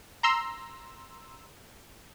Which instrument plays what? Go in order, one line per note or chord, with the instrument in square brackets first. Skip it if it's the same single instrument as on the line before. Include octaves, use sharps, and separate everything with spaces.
[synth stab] A#5 C6 E6